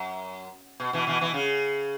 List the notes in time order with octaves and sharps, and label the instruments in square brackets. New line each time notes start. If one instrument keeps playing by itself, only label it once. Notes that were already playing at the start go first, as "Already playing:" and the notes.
Already playing: [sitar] F#2
B2
B2 E3
B2 E3
B2 E3
C#3